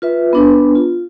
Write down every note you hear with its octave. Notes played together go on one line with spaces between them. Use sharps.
F4 B4 E5
B3 D4 B4
F4